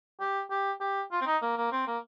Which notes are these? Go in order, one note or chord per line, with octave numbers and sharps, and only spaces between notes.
G4
G4
G4
F4
C4
D#4
A#3
A#3
C4
A#3